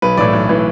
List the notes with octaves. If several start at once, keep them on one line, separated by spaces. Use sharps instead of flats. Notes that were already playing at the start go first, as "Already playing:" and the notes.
B1 B4
A2 E3 D5
B1
A2 E3